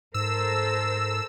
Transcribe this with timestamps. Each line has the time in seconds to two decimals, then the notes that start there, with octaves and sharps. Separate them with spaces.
0.14 G#2 A4 A#4 C5 E6